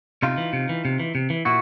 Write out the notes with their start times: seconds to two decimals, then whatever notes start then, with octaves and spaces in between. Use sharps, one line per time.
0.23 C3 D#4 F4
0.38 E3
0.53 C3
0.69 E3
0.85 C3
1.00 E3
1.15 C3
1.30 E3
1.45 A#2 E4 F#4